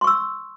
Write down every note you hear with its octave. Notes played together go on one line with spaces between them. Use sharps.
C6 C#6 E6